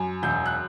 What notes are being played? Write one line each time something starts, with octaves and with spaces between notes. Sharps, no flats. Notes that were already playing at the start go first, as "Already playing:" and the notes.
Already playing: F#2
E1 G6
F#6